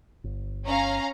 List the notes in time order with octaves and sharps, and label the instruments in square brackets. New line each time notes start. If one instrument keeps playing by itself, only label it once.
[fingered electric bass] G1
[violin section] C#4 F5 A#5